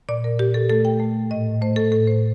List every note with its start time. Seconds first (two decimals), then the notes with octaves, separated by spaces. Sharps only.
0.09 A#2 D5
0.24 A#4
0.39 A#2 G4
0.54 A4
0.69 A3 A4
0.85 G5
1.00 A3
1.31 A2 D#5
1.61 A3 C5
1.76 A4
1.92 A2 A4
2.07 C5